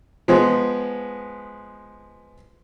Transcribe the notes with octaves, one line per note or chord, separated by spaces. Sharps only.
F3 G#3 B3